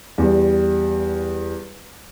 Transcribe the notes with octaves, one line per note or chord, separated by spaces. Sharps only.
E2 G3